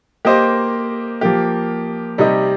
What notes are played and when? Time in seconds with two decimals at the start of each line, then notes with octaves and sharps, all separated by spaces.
0.25 A#3 G4 C5 D#5
1.21 F3 A#3 G4
2.18 C3 G3 D#4 G4 D#5